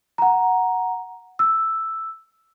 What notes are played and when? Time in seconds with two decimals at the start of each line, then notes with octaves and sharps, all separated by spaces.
0.18 F#5 A#5
1.39 E6